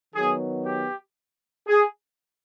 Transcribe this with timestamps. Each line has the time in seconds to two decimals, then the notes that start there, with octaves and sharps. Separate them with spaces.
0.15 D#3 F#3 B3 G#4
0.65 G4
1.67 G#4